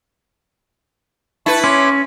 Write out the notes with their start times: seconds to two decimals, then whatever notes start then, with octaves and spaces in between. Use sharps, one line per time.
1.46 E4 B4 A5 C#6
1.64 C#4 C#5 C6 D6